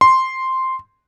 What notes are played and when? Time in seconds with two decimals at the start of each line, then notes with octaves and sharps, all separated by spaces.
0.01 C6